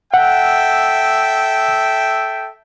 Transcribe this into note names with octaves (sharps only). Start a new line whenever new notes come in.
A4 E5 F#5 G5